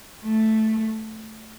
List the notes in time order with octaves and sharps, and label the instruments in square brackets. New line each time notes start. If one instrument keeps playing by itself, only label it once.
[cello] A3